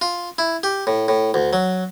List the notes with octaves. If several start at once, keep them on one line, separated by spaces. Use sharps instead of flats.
F4
E4
G4
A2
A2
D2
F#3